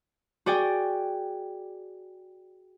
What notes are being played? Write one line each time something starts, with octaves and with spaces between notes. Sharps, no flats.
F#4 G#4 D5 G5